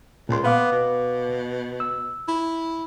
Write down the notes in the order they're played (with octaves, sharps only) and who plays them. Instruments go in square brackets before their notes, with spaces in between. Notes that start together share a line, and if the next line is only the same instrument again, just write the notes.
[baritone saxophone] C#2 [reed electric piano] A#2 C6
[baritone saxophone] B3 [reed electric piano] B4 F5 D6
[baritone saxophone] B2
[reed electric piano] E6
[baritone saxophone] E4